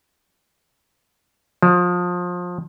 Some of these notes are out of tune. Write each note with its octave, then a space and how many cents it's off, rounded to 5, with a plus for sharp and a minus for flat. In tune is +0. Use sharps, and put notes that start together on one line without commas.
F3 +25